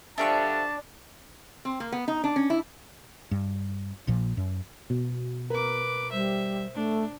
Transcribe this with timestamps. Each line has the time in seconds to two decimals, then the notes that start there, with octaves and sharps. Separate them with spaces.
0.18 D3 F3 G3 D4 D5 E5 A5 C#6
1.65 C4
1.80 A#3
1.92 B3
2.08 D#4
2.24 D4
2.36 C#4
2.50 E4
3.31 G2
4.07 A#1 A#2 F3
4.37 F#2
4.90 B2
5.50 A#4 B4 D6
6.12 G3 C5 E5
6.75 A3 D4